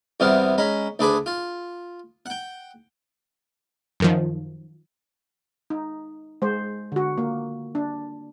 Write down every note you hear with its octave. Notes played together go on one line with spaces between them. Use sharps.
E2 C3 E3 G3 B3 F5
G#3 C#4 A#5 B5
D2 D4 G#4 B4 B5 D6
F4
F#5 G5
F#2 D#3 F3
D#4
G#3 C5
D3 F#4
A#3
D4